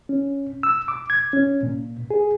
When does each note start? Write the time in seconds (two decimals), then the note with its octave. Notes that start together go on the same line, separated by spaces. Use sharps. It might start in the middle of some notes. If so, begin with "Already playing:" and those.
0.09 C#4
0.63 E6
0.88 D6
1.10 G#6
1.33 C#4
1.63 A#2
2.11 G#4